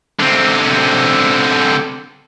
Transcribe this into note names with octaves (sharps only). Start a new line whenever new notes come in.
D3 C4